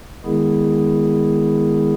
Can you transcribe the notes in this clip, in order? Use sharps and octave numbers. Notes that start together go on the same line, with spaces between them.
D#3 G#3 B3 E4 G#4